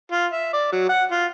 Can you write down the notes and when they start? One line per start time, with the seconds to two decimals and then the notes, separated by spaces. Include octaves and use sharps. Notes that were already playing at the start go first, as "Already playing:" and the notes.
0.12 F4
0.32 E5
0.53 D5
0.72 F#3
0.89 F#5
1.11 F4